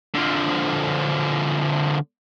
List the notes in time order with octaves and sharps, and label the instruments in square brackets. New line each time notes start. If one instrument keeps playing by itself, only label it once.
[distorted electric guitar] D3 F3